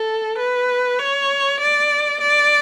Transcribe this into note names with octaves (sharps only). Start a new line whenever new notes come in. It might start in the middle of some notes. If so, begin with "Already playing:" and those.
Already playing: A4
B4
C#5
D5
D5